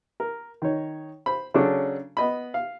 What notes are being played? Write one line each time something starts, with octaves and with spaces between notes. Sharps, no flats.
A#4
D#3 D#4 C#5
C5 B5
C#3 F#3 C#4 D4 A4
B3 D#5 B5
F5